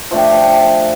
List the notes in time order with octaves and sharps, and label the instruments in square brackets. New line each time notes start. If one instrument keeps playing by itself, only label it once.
[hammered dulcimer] F3 A3 D4 G4